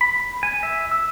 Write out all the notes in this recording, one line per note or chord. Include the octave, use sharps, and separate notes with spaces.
B5
G#5
E5
E6